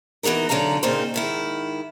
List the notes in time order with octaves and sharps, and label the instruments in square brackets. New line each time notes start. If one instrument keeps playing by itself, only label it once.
[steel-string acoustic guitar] E3 B3 D#4 F#4 A#4
D3 F#3 D#4 F5 A#5
A#2 C#3 A#3 C4 D#4 C5
G#2 D#3 E4